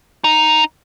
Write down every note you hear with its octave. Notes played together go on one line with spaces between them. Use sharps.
D#4